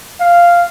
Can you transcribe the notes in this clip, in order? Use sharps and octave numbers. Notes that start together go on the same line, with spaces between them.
F5